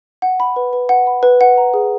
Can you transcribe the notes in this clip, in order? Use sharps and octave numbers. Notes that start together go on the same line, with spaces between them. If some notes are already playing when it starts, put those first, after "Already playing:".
F#5
B5
B4
B4
F#5
B5
B4
F#5
A#5
G#4